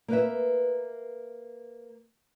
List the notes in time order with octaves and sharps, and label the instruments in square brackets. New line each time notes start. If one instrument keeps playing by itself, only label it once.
[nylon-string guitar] A#3 B4 E5